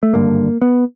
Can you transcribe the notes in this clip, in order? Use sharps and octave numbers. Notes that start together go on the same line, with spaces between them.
A3
G#1 G2 D3 A#3
B3